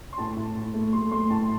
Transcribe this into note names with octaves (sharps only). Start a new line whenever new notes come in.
C6
A2 A5
A2
A2
A3
A3 C6
A3 C6
A2 A5